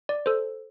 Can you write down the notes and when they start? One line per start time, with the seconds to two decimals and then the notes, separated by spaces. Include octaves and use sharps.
0.09 D5
0.26 A4 C5